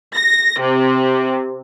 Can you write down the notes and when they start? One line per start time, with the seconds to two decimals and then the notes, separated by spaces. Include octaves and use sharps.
0.15 A#6
0.60 C3